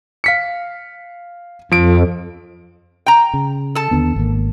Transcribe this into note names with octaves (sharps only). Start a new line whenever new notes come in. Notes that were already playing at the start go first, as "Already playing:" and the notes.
F5 B6 C#7
F2 F3 D7
G5 A#5
C#3
A4 A5
D#2 D3 B3
G#1 A#3